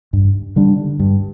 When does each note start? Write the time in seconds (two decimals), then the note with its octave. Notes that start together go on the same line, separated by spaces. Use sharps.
0.13 G2
0.56 D3 G3 D4
0.99 G2